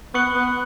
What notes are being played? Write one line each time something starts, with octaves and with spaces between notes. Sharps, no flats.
B3 C#6 F#6 C#7 F#7
B3